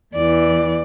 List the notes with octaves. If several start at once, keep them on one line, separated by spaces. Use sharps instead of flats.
E2 E3 D5